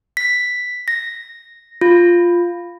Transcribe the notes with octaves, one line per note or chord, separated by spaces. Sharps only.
B6
A#6
F4